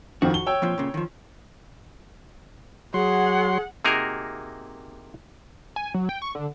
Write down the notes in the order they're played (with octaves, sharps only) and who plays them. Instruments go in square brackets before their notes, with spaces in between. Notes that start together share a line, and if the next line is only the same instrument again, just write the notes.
[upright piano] F2 D#3 F3 [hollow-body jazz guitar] F#4
[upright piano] G7
C#5 G5 E6
[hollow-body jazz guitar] F2 A#2 F3
A#2 C#3
D#3 F3
[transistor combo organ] F#3 C6 [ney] G#4 [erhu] F#5
[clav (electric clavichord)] C3 A#3 D#4 F#4 G#4 A#4
[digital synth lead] G#5
F#3
G5
C#6
D3